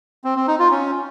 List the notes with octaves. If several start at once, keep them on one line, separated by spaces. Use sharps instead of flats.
C4
C4
D#4
F4
C#4